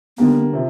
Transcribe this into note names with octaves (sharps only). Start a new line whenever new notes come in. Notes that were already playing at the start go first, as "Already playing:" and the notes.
D3 G3 A#3 B3
C3 F3